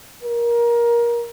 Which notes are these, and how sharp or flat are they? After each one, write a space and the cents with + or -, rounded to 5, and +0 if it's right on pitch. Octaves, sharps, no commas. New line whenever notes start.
A#4 +20